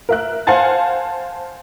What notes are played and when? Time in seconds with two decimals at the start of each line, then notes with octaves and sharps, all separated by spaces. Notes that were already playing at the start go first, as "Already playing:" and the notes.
0.09 A#4 E5 F#6
0.47 C5 F5 F#5 G#5 A5 A6